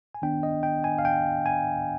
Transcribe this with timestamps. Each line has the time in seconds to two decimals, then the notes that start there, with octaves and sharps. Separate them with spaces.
0.15 G#5
0.22 D#3 B3 D4 G5
0.43 D#5
0.63 G5
0.84 G#5
0.98 F5
1.05 G5
1.46 G#5